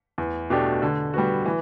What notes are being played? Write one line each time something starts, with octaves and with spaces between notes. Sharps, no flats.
E2
B2 A3 D4 G4
D3
G3 B3 F#4
E3